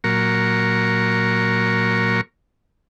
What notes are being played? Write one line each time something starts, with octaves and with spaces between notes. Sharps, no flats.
A#2 F#3 A#4 C#6